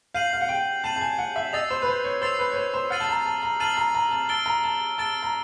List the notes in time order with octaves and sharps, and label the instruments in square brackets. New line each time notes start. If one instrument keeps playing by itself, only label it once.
[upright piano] F5 [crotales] G6 C7 D#7 F#7
[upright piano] F5
F#5
G5
[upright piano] A5 [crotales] G6 C7 D#7 F#7
[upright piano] A5
G#5
F#5
E5
[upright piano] D#5 [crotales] E6 A6 C7 F7
[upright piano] C5
B4
C5
C#5
[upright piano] C5 [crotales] E6 A6 C7 F7
[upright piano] B4
C#5
C5
C5
[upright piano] F#5 [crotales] F6 A6 C7 D#7 F#7
[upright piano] A5
A#5
A5
A#5
[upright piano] A5 [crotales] F6 A6 C7 D#7 F#7
[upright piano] A#5
A#5
A5
[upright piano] A5 [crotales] E6 A6 D7 G7
[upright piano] A#5
A5
[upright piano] A5 [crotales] E6 A6 D7 G7
[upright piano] A#5